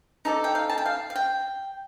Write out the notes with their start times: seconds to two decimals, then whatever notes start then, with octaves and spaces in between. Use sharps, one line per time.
0.25 D#4 A4 D5 D#5
0.44 G5
0.55 F5
0.70 A5
0.78 G5
0.86 F5
1.10 F5
1.16 G5